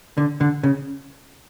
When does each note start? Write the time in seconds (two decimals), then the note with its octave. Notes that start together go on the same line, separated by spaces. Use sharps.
0.17 D3
0.41 D3
0.63 C#3